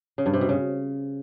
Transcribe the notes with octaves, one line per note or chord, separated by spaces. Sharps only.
C#3
G2
C3
B2
C#3